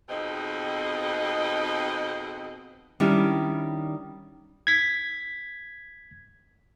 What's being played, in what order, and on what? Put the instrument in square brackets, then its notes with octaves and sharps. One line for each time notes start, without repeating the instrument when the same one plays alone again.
[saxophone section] F2 B2 C4 D#4 G#4 D#5
[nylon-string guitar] D#3 G3 C#4 D4 E4
[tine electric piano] G#6 B6